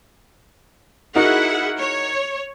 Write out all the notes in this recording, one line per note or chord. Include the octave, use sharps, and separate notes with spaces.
D#4 E4 F#4 G#4 A#4 F#5
C#5